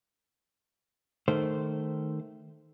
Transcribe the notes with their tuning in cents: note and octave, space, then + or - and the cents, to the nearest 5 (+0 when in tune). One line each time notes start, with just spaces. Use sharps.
D#3 -10 A3 +0 C5 -10